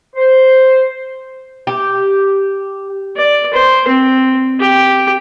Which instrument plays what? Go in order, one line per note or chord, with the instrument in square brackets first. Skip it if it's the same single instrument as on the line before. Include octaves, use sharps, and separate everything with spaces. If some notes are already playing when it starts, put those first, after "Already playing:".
[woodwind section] C5
[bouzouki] G4
[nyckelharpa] D5
C5
C4
G4